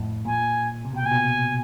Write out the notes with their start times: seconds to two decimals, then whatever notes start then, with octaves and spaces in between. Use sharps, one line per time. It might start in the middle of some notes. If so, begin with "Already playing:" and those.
Already playing: F2 A2
0.25 A#2 G#5
0.85 C3
0.94 B2 G5
1.03 A#2 G#5
1.12 B2